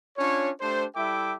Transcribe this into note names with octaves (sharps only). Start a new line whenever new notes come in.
C#4 D4 F4 C#5
A3 D4 G4 C5
G3 E4 A4 E5 G5 D6